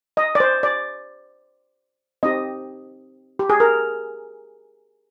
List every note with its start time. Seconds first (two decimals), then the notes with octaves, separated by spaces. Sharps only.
0.17 D#5
0.35 D5
0.40 C5
0.63 D5
2.23 C4 D#4 G4 D#5
3.39 G4
3.50 G#4
3.60 A#4